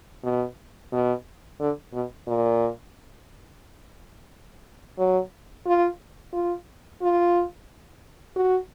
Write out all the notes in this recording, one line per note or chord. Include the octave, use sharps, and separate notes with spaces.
B2
B2
D3
B2
A#2
F#3
F4
F4
F4
F#4